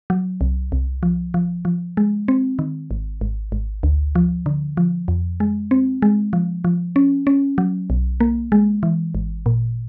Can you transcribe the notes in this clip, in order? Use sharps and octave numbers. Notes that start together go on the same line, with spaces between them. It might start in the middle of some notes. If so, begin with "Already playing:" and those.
F#3
C2
C2
F3
F3
F3
G#3
C4
D#3
G#1
G#1
G#1
D2
F3
D3
F3
F2
G#3
C4
G#3
F3
F3
C#4
C#4
F#3
B1
A#3
G#3
E3
G#1
A#2